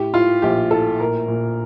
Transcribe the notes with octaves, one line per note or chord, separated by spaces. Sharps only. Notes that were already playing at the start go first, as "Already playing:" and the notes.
Already playing: A2 G4
A2 F4
A#1 G4
A2 A4
A#2 A#4
A#2